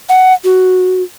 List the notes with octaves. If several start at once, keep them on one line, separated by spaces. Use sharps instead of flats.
F#5
F#4